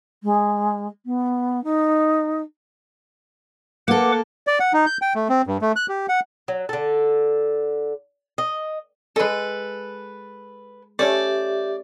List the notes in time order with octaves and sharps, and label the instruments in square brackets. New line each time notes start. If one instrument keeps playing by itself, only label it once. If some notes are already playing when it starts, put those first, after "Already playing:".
[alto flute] G#3
B3
D#4
[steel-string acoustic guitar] A#3 A4 [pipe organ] B4 F#5 D6
[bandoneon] D5
F#5
D#4
G6
G5
A3
C4
G2
A3
F#6
G4
F#5
[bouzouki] F#3
D3 A4
D#5
[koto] G#3 D#5 [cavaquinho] A4 B4
[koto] A3 C#4 A4 [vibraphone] G4 E5 [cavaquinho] D5